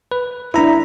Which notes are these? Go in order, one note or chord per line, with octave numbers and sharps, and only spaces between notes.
B4
D4 E4 E5 A#5